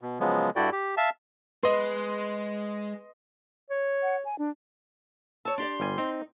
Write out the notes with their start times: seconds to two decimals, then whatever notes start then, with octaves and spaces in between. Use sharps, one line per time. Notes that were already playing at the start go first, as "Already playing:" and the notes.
0.01 B2
0.20 C#3 F3 F#3 G#3 B3
0.56 G2 E4 F#4 A4 D5 G5
0.72 G4
0.97 E5 F5 A5
1.63 G#3 B4 D#5 C6
3.70 C#5
4.02 F#5
4.25 G#5
4.39 D4
5.45 C#5 A5 E6
5.58 D4 G4 D5 C6
5.80 G1 G3 G#5
5.98 C4 D#4